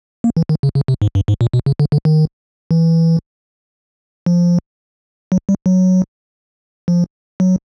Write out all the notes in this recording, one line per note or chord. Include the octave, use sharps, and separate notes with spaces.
A#3
E3
D#3
C#3
C#3
C3
G#2
G2
G#2
A#2
B2
C#3
D3
D3
D#3
E3
F3
F#3
G3
F#3
F3
F#3